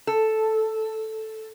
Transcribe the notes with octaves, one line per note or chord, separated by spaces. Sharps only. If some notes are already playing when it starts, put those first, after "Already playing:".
A4